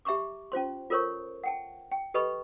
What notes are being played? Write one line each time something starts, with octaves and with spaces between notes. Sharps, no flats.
G4 E5 A#5 C#6 D6
C#4 F4 C5 C6
F4 A4 A#4 C5 C#5 C#6
F#5 G5 A5
G5
G4 A4 B4 D#5 B5 C#6